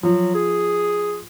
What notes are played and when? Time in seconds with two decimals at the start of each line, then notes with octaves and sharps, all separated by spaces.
0.03 F3 F#3
0.35 G#4